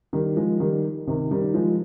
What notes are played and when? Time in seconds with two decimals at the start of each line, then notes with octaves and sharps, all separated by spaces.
0.13 D#3 G3
0.36 F3 G#3
0.60 D#3 G3
1.07 C3 D#3
1.31 D#3 G3
1.54 F3 G#3